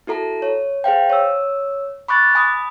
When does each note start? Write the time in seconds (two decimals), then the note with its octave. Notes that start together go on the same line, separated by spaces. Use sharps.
0.07 E4 F#4 A4 A#5
0.42 C#5
0.84 G#4 C5 F5 G5
1.10 C#5 E6
2.08 B5 C#6 D6 F#6 A6
2.35 G#5 B5 D#6